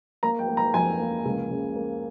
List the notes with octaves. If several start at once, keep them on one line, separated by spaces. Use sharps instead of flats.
A#3 A#5
G5
A#3
A#5
F2 G#5
A#3
C#2
C#3
A#3